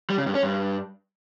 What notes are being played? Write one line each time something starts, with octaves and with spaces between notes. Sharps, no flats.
G3
C#3
G2
C#4
G2